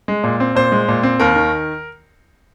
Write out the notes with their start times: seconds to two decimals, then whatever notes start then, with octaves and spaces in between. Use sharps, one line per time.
0.08 G#3
0.24 A#2
0.40 C4
0.55 A#2 C5
0.72 G#3
0.88 A#2
1.03 C4
1.20 D#2 A#4
1.36 D#3